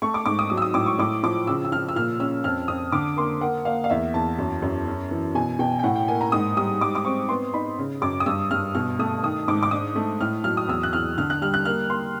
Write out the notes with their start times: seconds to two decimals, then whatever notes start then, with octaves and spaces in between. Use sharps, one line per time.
0.02 A3 C#6
0.14 D6
0.26 G#2 D6
0.39 D#6
0.50 F#3 D#6
0.57 E6
0.62 D#6
0.74 A2 D6
0.86 C#6
0.99 A2 D6
1.23 F3 D6
1.47 C#3 E6
1.65 E6
1.72 F3 F6
1.89 E6
1.96 A#2 F6
2.20 C#4 E6
2.44 F2 F6
2.68 F2 D#6
2.92 D3 D6
3.17 A#3 C6
3.41 A#3 F#5
3.65 A#3 F5
3.84 F5
3.90 E2 E5
4.14 E2 A5
4.39 F#2
4.62 F#2
4.86 C#4
5.11 E3
5.35 B2 G#5
5.59 B2 G5
5.79 G5
5.83 A2 F#5
5.96 G5
6.08 A#3 G#5
6.21 A#5
6.32 G#2 D#6
6.57 G3 D#6
6.81 G3 D6
6.95 D6
7.05 C4 C#6
7.29 B3 C6
7.54 D#4 B5
7.78 C#3
8.02 F#2 D6
8.20 D#6
8.26 G2 E6
8.51 G2 F6
8.75 B2 F6
8.99 A3 D#6
9.23 D#3 D#6
9.48 G#2 D6
9.63 D6
9.71 D4 D#6
9.95 A3
10.21 A2 F6
10.44 F#3 F6
10.57 D#6
10.68 E2 E6
10.83 F#6
10.93 E2 F6
11.17 D3 F6
11.30 F#6
11.42 G3 F6
11.54 F#6
11.65 A#3 F6
11.90 A#3 C6